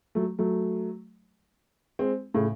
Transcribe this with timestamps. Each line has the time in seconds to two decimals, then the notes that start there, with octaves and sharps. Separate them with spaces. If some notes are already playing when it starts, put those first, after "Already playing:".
0.15 F#3 A3
0.39 F#3 A3
1.99 G#3 C4
2.34 A2 C#3